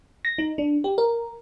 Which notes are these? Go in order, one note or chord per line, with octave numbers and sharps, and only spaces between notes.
A#6
D#4
D4
G4
A#4